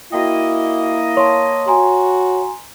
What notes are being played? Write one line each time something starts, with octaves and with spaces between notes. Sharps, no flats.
A#3 E4 F#4 D#5 G5
C#5 A5 C6
F#4 G#5 A#5 C6